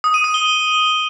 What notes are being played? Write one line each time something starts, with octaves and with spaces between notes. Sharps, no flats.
D#6
D#7
D#6
G7